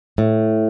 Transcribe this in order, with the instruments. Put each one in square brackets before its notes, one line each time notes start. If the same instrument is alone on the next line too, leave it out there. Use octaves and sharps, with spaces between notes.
[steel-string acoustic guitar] A2